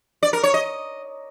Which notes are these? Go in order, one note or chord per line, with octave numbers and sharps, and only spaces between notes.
D5
A#4
C#5
D#5